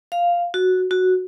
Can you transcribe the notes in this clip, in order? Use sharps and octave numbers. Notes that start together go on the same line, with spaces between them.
F5
F#4
F#4